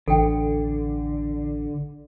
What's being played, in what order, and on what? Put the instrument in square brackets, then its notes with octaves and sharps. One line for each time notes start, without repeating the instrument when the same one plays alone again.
[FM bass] A1 [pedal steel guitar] D3 [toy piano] A4 G5